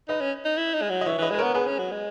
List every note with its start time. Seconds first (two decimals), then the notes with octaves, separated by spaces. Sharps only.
0.08 D#4 B4 D#5
0.21 C#4
0.45 D#4
0.58 E4
0.74 D#4
0.82 G#3
0.90 F#3
1.01 D#5
1.06 E3 C#5 E5
1.18 E3 B4 D#5
1.30 G#3 B4
1.38 B3 A#4 C#5
1.54 B3 G#4 B4
1.67 C#4
1.79 F#3
1.91 G#3